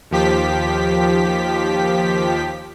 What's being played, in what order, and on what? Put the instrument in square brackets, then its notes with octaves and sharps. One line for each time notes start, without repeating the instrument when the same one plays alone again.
[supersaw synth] D#2 F3 G4 B6